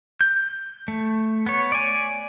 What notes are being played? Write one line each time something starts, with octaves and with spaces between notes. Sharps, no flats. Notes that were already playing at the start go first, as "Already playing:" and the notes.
G6
A3
B3 C#5
D5 G#5